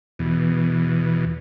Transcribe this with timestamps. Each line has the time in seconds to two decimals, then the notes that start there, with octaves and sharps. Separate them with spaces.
0.19 E2 B2